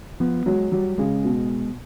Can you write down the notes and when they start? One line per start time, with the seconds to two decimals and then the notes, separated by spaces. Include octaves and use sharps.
0.20 F3 B3
0.46 F#3 G#3
0.72 F#3 G3
0.98 C#3 G#3
1.24 B2